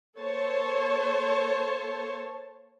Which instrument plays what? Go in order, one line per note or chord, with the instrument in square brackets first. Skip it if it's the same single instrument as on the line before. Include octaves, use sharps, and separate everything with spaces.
[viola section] A#3 A4 C5 C#5 A5